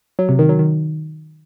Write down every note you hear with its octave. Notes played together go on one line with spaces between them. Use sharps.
F#3
C3
D#3
F#3
D#3